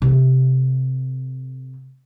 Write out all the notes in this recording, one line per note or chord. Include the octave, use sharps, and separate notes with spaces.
C3 A3